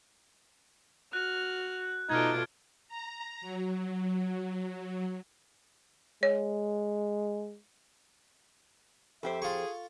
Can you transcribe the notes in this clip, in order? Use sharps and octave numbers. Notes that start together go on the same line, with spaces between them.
F#4 F6 F#6
B2 A3 D#4 F4 D5 F6 G#6
A#5
F#3
G#3 C#5
F2 G4 A4 C5 E5
F4 G#4 C#6